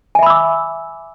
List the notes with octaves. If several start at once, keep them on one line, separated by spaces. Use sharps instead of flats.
E5 G#5 B5 D6 E6